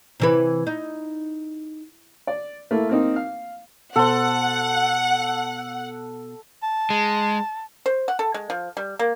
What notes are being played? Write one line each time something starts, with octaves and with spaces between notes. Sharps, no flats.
C3 E3 B4
D#4
D5
A3 A#3 E4
A#3 C4 D#4
F5
B2 A4 C5 F#5
A5
G#3
C5
F#5
A4
G#3
F3
G3
A#3